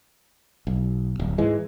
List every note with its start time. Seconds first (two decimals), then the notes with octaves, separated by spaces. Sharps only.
0.67 B1
1.19 D1
1.38 G#2 E3 G#3